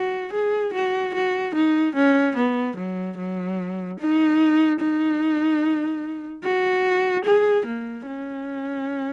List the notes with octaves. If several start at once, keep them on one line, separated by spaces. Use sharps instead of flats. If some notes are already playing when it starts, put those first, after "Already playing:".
Already playing: F#4
G#4
F#4
F#4
D#4
C#4
B3
F#3
F#3
D#4
D#4
F#4
G#4
A#3
C#4